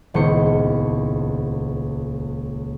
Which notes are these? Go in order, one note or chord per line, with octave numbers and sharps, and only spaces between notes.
D#1 C#2 B3 E4 C5 C#7